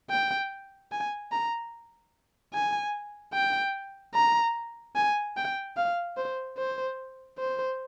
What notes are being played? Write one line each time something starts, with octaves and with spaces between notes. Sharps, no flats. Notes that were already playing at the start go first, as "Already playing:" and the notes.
G5
G#5
A#5
G#5
G5
A#5
G#5
G5
F5
C5
C5
C5